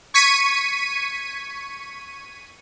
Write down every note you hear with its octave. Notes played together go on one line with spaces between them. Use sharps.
C#6 G#6 B6 C#7 D#7